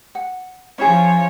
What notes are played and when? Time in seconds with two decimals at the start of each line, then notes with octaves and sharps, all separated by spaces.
0.15 F#5
0.78 F3 C#4 E4 G#4 C#5